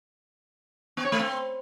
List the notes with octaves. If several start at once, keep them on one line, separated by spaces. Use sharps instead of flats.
B3
C#5
A3
C4